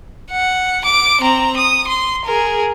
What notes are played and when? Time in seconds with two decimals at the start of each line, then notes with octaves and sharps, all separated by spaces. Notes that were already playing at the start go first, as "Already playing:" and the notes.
0.31 F#5
0.85 D6 D7
1.21 C4 A#5
1.58 D#6
1.88 C6
2.26 G#4 A#4